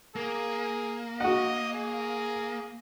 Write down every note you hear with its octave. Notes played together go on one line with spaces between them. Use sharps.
A#3 G#4
F#4 D#5 F#5
G#4